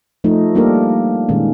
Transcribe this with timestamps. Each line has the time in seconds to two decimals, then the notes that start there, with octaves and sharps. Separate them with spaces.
0.24 F3 A3 D#4
0.55 G3 A#3 D4 G4 A4 A#4
1.29 A#2 D#3 G#3 C#4